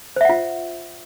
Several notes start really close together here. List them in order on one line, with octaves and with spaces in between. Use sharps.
C5 E5 F#5 F4